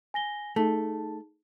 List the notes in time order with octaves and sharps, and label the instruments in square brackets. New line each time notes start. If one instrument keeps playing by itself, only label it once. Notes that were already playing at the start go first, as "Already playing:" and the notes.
[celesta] G#5 A#6 G7
[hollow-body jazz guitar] A3 [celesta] D#4 G#4 A5